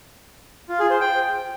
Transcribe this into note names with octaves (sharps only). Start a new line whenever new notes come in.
F4
G#4
C5
G5